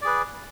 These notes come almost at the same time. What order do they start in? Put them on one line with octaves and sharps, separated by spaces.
D5 G#4 B4